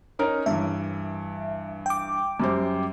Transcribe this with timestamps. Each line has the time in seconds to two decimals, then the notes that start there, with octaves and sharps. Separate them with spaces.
0.19 C#4 D#4 A#4
0.46 G2 E3 E5
1.86 G5 D6
2.40 F#2 G3 C5